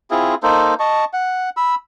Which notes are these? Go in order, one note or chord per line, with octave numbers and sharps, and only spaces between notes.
C4 E4 F4 G#4
A#3 D#4 A4 C5
D#5 A5 C#6
F#5
B5 E6